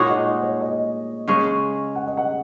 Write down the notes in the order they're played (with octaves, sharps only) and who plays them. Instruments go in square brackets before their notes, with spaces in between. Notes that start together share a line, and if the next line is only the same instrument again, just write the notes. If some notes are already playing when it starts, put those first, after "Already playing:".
Already playing: [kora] A#2 G#3 D#4 F#4 [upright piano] C#5
[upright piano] D#5
D#5
C#5
D#5
[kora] C#3 G#3 C#4
[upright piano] F#5
D#5
F#5